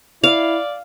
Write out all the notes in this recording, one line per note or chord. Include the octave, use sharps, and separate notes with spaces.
E4 D5 F5